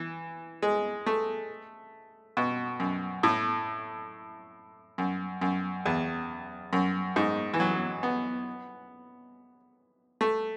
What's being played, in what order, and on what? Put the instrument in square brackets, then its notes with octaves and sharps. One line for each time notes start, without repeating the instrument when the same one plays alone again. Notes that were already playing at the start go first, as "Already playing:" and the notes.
Already playing: [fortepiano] E3
G#3
A3
B2
F#2
A2
F#2
F#2
E2
F#2
G#2
E3
F#3
B3
A3